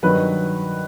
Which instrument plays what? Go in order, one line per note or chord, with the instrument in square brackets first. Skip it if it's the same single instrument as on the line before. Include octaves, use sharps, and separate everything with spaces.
[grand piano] G2 D#3 F#3 B4